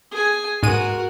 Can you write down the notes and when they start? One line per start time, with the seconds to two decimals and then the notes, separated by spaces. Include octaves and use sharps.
0.12 G#4 G#5
0.63 G#2 G#3 F#4 A#4 D#7